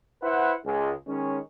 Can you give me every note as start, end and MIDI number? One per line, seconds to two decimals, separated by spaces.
0.22 0.54 64
0.22 0.54 71
0.22 0.54 72
0.22 0.54 78
0.65 0.91 37
0.65 0.91 56
1.06 1.38 51
1.06 1.38 56
1.06 1.38 61